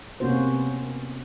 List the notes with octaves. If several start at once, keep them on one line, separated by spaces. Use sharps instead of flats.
C3 A#3 B3 C#4 F#4 C5